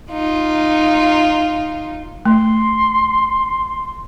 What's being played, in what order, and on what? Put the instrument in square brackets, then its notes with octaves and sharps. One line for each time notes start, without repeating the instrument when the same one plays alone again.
[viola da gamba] D#4 F4
[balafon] A3 [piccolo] C6